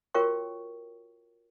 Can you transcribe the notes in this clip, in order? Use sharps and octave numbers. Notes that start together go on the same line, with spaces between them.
F4 F#4 A#4 C#5 G5 C#6